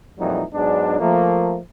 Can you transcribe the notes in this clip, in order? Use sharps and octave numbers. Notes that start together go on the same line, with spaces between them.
F2 A#2 E3 F#3 G3 D#4
G#2 F#3 G#3 B3 D4
F3 A3 A#3